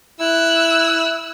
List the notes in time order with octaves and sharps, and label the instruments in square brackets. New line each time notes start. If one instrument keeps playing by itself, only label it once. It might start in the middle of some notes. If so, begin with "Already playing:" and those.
[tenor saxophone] E4 [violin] E6 F#6